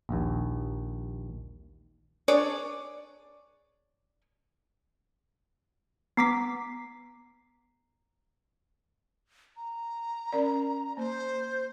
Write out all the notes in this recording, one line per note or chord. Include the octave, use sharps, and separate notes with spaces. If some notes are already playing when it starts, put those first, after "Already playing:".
A#1 D#2
D4 G#4 C#5 D5
B3 A#5 D6 B6 C7
A#5
C#4 A#4 D5
A#3 C5